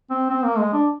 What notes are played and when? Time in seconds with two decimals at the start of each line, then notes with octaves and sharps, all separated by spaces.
0.10 C4
0.30 C4
0.44 A#3
0.59 G#3
0.73 D4